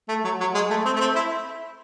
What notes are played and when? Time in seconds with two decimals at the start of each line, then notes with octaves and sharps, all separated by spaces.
0.09 A3
0.24 F#3
0.40 F#3
0.54 G#3
0.70 A3
0.85 C4
0.96 A3
1.00 C4
1.15 E4